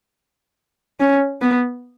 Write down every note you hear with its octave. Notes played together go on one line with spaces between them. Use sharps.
C#4
B3